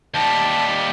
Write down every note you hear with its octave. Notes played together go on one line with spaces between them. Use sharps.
D#2 G3 A5